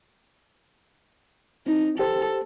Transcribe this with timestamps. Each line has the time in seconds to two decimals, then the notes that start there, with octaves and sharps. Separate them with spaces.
1.67 C4 D#4
1.99 G4 A4 C5